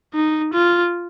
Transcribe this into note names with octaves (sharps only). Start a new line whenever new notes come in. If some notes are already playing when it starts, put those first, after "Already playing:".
D#4
F4